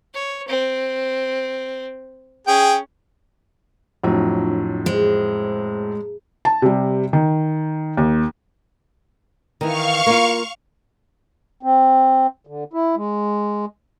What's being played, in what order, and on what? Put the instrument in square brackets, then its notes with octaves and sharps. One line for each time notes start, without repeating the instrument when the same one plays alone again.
[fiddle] C#5
C4
[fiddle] C#4 [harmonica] G#4 G5
[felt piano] F2 A2 F#3 [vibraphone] D4 F4
[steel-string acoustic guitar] G#3 [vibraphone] C5
[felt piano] A5
C3 G3
D#3
D#2
[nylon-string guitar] D#3 E3 [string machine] F5 C#6 F6
[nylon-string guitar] A#3 F4
[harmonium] C4
D3
E4
G#3